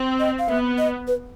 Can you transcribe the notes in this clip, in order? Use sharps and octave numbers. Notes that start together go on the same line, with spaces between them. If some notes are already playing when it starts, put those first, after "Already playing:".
Already playing: C4
D#5
F5
B3 E5
D#5
B4